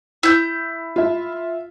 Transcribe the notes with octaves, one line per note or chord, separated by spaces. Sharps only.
E4 G6
F4 E5